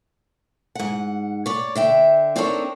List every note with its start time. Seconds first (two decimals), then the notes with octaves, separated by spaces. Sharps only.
0.75 G#2 F#5
1.46 C#5 D5
1.75 D3 E5 G5
2.36 C4 D4 D#4 A4 A#4 C#5